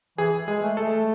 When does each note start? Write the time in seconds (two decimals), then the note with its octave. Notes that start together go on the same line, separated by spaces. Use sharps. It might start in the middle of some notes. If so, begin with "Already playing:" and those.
0.18 E3 G#4
0.48 G#3 G#4
0.62 A3
0.77 A3 A4